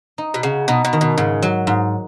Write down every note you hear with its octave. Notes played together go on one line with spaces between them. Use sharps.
D#4
B2
C#3 F#4
B2 D#4
B2
D#3
B2
G#2 C#3
F#3
G#2